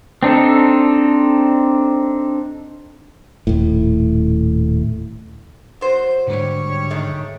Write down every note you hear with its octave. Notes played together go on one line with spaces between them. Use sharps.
C4 D4 D#4 A4
D#1 A2
F#3 C5
G#2 D3 G3 C#5
D#3 G#3 A3